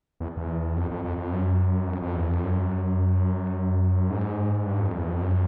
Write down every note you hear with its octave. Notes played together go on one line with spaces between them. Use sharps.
E2
E2
F2
F2
F2
F2
F#2
F2
F2
E2
F2
F#2
G#2
G2
F2
E2
F2
F#2